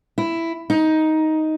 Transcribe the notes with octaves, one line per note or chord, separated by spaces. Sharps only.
E4
D#4